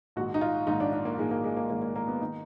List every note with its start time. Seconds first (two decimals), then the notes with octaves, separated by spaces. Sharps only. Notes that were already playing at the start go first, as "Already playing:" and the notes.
0.16 A#1 G#2 D#3 F#4
0.34 D#4
0.41 F4
0.67 A#1 G#2 D#3 D#4
0.80 D4
0.93 D4
1.05 A#3
1.18 A#1 G#2 D#3 G#3
1.31 A#3
1.44 G#3
1.57 A#3
1.70 A#1 G#2 D#3 A#3
1.82 A#3
1.96 A#3
2.08 B3
2.21 D#3 D#4